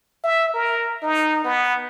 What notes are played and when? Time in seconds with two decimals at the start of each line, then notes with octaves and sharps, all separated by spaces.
0.24 E5
0.54 A#4
1.03 D#4
1.45 B3